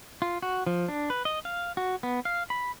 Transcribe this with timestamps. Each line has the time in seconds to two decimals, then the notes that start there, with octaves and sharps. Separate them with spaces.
0.22 F4
0.42 F#4
0.67 F3
0.88 D4
1.10 B4
1.25 D#5
1.45 F5
1.77 F#4
2.03 B3
2.25 F5
2.50 B5